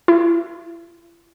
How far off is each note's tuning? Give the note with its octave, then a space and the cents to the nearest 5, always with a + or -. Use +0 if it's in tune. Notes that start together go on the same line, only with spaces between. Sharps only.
E4 +45